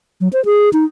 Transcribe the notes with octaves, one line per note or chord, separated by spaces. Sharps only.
F#3
C5
G#4
D#4